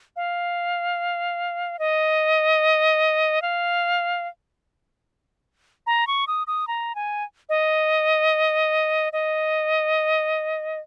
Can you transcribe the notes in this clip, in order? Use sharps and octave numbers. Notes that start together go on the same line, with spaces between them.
F5
D#5
F5
A#5
C#6
D#6
D#6
A#5
G#5
D#5
D#5